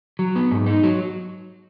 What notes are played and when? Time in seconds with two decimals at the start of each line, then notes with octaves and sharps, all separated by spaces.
0.19 F#3
0.36 B3
0.51 G#2
0.66 D#4
0.83 F#3